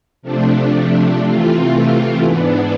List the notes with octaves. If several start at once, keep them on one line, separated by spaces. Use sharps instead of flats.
C3 F3 A3 D4
C3 E3 A3 C4 F4
G#2 E3 B3 D4